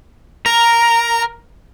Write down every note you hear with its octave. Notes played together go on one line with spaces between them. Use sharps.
A#4 A#5